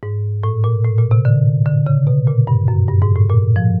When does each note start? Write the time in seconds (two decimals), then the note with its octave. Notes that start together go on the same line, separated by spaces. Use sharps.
0.03 G#2
0.44 A2
0.64 A#2
0.85 A2
0.98 A#2
1.11 C3
1.25 D3
1.66 D3
1.87 C#3
2.07 B2
2.27 A#2
2.47 G2
2.68 F#2
2.88 G2
3.02 G#2
3.16 A2
3.30 A#2
3.56 F3